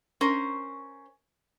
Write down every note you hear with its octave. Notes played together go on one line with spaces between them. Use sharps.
C#4 A#4 C5